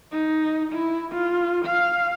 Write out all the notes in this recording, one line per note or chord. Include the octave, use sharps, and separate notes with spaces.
D#4
E4
F4
F5